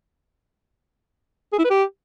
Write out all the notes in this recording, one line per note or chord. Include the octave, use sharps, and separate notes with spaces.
G#4
E4
B4
G4